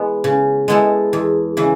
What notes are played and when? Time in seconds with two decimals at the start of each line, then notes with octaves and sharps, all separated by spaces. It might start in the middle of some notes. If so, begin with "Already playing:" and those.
Already playing: E3 G#3 B3
0.24 C#3
0.68 G#3 B3 E4 A4
1.13 E2
1.57 C#3 E3